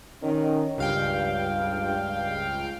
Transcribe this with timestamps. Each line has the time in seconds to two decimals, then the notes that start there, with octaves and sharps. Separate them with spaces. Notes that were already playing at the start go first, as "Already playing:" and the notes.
0.23 D#3 C#4
0.78 C#2 G2 F5 G5